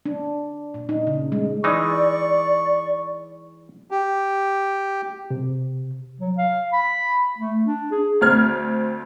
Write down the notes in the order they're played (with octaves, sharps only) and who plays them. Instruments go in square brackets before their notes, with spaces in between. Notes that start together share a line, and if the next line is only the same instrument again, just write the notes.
[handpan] D4
A#2
D#4
C#3
G#3
[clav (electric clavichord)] E3 G#3 D#4 [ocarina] D5 [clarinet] C#6
[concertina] G4
[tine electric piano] C3
[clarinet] F#3
F5
B5
A3
D4
G#4
[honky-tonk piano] D2 C4 F6 G#6